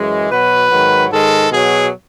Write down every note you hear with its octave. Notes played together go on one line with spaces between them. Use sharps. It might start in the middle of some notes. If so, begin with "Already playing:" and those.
Already playing: F#2 E3 G#3
B2 F#3 B4
G#2 D#3 F#3
G#2 D#3 G#3 A4
B2 F#3 G#4